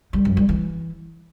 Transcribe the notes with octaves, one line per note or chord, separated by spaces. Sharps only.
G3
F#2
G3
E3